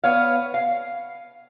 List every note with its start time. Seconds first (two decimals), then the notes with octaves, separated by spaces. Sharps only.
0.04 B3 C#5 F5
0.54 F5